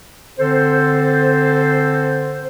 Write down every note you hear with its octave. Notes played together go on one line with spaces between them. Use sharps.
D3 C4 A4 C5